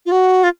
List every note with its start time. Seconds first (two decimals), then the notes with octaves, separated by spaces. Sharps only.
0.06 F4
0.12 F#4
0.43 F4